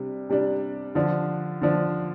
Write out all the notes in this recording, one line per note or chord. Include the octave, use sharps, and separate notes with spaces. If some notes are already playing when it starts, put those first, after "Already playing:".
Already playing: C3 G3 D4
C3 G3 D4
D3 F3 D4
D3 F3 D4